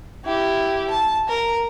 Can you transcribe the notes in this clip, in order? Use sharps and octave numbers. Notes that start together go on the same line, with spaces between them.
E4 G4
A5
A#4